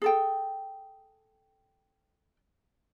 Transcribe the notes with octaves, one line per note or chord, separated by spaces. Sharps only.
G#4 A4 G5